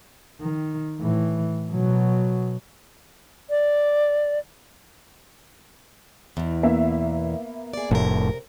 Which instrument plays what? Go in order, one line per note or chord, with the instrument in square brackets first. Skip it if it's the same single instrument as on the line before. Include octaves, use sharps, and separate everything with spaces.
[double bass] D#3
A2 E3
B2 F#3
[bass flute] D5
[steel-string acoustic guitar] E2 B2
[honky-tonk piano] A#3 B3 E5
[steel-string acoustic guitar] G#4 D5
[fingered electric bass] F1 A2 [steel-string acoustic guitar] C3 A#4